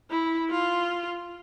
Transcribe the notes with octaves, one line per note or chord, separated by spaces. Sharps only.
E4
F4